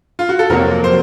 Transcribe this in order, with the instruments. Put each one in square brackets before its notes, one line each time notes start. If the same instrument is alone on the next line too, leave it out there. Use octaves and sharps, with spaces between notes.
[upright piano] F4
F#4
A4
[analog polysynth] F2 C3 F#3 A#3 [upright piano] A#4
[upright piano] C5